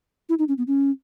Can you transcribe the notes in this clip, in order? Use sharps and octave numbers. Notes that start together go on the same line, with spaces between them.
E4
D#4
C#4
B3
C#4